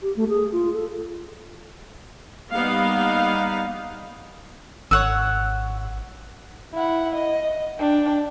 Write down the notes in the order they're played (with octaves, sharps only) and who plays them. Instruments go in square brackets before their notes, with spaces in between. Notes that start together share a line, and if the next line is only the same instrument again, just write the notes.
[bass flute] G4
A3
G#4
F4
A4
[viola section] G3 A#3 B3 D#4 F5
[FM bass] G#1 [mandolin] C#5 F#5 E6
[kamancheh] E4 F#5
D#5
D4 G5